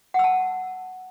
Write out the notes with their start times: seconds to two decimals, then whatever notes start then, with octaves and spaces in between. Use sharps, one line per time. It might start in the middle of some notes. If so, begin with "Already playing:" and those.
0.14 F#5
0.19 E6
0.24 A5